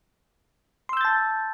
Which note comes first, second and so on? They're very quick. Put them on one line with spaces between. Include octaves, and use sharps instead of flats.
C6 E6 G6 A6 A5